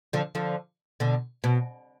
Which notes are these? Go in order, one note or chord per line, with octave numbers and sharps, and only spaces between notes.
D3 F3
D3 F3
B2 D3
B2